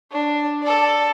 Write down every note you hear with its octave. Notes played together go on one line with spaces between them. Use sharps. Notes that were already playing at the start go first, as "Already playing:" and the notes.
D4
A4 D5